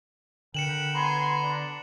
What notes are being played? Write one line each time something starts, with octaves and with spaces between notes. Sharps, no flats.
D3 A#4 B4 G5 C#7 E7 F#7
B3 C#5 G#5 A#5 C6
D4